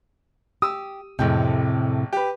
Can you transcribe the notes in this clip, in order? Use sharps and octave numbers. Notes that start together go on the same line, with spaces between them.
G4 D#6 E6
A1 F2 A2 C3 G#3 G5
G4 B4